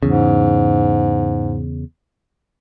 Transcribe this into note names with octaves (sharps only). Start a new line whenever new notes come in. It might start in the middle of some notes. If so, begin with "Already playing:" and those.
E2 G#2 C#3